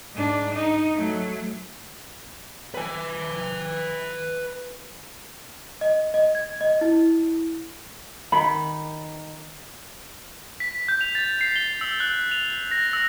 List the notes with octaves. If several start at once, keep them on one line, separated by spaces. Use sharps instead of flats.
G#2 D4
D#4
F#3 A3
B4 G#5
D#5
D#5
G#6
D#5
E4
D#3 B5
B6
G6
F7
A6
C7
G7
E6
F#6
F7
A#6
E6